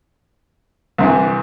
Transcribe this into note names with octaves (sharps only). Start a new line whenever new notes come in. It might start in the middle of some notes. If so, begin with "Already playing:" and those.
C2 C3 E3